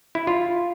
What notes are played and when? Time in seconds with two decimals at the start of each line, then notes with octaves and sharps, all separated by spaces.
0.15 E4
0.27 F4